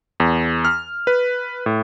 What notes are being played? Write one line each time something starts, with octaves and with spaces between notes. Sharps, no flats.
E2
F6
B4
A2